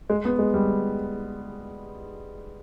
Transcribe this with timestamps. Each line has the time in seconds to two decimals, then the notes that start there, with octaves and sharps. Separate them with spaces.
0.10 G#3
0.25 B3
0.39 G#3
0.54 G3